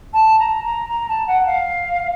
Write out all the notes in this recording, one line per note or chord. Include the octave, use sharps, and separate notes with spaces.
A5
A#5
A#5
A#5
A5
F#5
F5